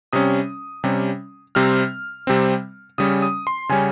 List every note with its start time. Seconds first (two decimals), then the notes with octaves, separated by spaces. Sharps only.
0.13 C3 G3 C#4 D#6
0.84 C3 G3 C#4
1.55 C3 G3 C4 F6
2.27 C3 G3 C4
2.98 C#3 G3 C#4 D#6
3.22 D#6
3.47 C6
3.69 C#3 G3 C#4 G#5